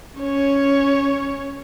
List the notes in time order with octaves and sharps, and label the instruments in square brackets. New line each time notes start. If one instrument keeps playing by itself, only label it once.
[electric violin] C#4 C#5